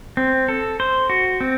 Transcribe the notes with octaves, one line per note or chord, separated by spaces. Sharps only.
C4
A4
C5
F#4
C4